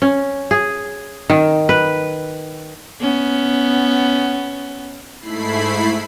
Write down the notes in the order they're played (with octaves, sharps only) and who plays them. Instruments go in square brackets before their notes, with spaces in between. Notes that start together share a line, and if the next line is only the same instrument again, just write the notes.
[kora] C#4
G#4
D#3
B4
[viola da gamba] B3 C#4
[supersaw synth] G#2 A3 E4 B5 C7